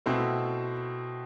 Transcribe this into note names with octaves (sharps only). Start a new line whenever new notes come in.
B2 A3 C4 E4